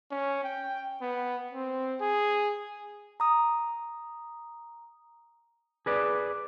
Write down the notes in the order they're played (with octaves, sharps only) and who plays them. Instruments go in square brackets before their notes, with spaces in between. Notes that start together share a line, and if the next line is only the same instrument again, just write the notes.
[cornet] C#4
G5
B3
C4
G#4
[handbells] A#5 D#6
[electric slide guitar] G#4 B4 D5